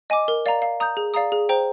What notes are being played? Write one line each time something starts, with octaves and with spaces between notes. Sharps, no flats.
D#5 G#5 D6
A#4
D5 F5 A#5
F5
A#5 D#6 G6
G#4
D5 F5 A#5 D#6
G#4
C5 G5 A#5